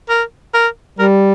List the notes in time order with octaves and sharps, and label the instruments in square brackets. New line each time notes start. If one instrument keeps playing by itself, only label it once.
[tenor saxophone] A#4
A#4
[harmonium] G3 [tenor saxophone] A#4